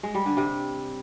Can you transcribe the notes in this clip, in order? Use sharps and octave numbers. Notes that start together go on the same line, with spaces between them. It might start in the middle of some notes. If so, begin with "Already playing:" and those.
G#3
G3
D3
C3